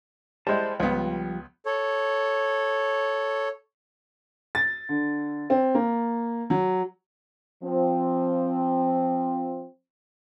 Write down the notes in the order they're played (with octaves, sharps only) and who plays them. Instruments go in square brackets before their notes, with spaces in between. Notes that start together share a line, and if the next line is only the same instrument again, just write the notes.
[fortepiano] G3 G#3 E4 [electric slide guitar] C5 A5
[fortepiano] C#2 B3 [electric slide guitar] F3 G3
[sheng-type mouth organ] A4 C#5
[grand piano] A6
D3
C4
A#3
F#3
[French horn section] F3 C4